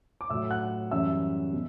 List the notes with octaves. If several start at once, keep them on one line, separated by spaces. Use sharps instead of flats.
D6
A2 F#3 E5 E6
F#5 F#6
F#2 E3 G3 E5 E6
B2